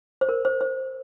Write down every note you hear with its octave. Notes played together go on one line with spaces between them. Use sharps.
C5
A#4
C5
C5